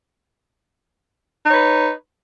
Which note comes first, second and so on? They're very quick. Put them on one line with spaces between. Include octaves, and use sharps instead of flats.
D#4 C#5 B4